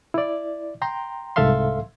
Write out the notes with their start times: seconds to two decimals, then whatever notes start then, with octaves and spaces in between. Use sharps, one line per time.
0.14 E4 D5
0.82 G5 A#5 C6
1.36 C2 G#2 A4 E5 F5 C6